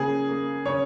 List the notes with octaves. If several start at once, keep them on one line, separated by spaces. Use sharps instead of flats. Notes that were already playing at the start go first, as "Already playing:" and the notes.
Already playing: C#3 A#3 G#4
A#3
C#3 C#5